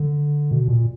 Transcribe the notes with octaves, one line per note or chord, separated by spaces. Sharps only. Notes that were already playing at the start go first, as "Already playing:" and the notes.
Already playing: D3
B2
A#2